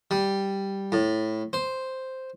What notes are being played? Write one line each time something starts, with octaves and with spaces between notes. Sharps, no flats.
G3
A2
C5